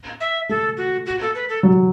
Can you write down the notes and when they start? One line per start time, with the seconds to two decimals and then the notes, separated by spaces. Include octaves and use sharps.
0.20 E5
0.49 A3 A4
0.77 F#4
1.06 F#4
1.21 A4
1.35 B4
1.49 A4
1.63 F#3